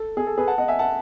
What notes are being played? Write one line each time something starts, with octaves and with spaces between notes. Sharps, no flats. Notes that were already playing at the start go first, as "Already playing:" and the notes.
Already playing: A4
G#4
A4
G#4 B4
F#5 A5
D#5 F#5
E5 G#5
F#5 A5